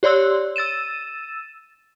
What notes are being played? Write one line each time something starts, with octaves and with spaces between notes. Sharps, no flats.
G4 C#5 D5 C6 E6 F#6
E6 A6 D#7 E7